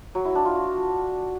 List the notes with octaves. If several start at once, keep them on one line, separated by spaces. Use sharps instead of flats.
F#3
E4
D4
F4
F#4